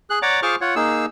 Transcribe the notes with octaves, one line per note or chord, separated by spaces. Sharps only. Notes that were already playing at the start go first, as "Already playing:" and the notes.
G#4 F#6
C#5 D5 F#5 A#5 D6
F4 G#4 C5 C#6 D6 F6
F4 C#5 F#5
A#3 D#4 G#4 E6